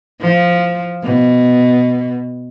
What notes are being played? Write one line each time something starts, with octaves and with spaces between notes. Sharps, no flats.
F3
B2